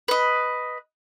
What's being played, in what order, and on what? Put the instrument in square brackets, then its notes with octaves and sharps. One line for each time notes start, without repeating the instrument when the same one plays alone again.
[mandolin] B4 D#5